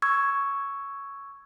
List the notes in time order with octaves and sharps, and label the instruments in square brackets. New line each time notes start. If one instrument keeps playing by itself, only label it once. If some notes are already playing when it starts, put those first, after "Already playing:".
[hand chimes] C#6 E6 G#6